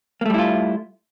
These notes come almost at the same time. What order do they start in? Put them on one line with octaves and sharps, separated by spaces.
A#3 A3 G3 E4 F4